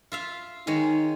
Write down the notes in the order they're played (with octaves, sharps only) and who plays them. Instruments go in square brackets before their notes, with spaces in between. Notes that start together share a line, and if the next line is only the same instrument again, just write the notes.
[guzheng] F4 E5 F5
[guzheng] D#3 G#3 C#5 [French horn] D#4